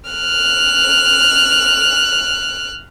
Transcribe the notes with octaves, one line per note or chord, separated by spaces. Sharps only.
F6 F#6